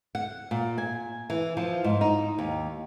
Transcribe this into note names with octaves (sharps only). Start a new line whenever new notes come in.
F#5
A#2
G#5
E3
F3
G#2
D#4
D#2